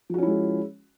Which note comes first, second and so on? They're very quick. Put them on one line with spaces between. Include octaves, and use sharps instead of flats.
F3 F#4 C#4 E4 G#3